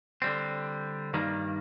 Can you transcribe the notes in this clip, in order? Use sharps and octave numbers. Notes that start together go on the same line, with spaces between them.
D3 G3 C4
G2 D#3 G3 A#3